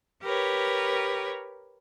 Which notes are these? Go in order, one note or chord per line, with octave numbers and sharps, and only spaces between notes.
G4 A#4 B4 C#5